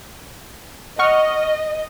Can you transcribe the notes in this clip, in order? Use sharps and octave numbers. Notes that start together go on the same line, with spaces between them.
D#5 F#5 C#6 F6